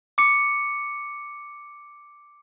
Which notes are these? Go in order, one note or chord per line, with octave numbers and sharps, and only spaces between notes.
D6 C#7